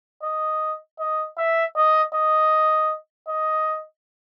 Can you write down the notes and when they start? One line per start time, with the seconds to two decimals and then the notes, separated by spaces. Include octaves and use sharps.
0.23 D#5
1.00 D#5
1.38 E5
1.76 D#5
2.14 D#5
3.29 D#5